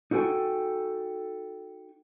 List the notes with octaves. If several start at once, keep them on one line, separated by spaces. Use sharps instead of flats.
D#4 F#4 A4 G5 G#5